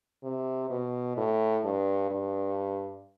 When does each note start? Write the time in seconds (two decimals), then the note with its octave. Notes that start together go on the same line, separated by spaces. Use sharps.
0.23 C3
0.70 B2
1.17 A2
1.64 G2
2.11 G2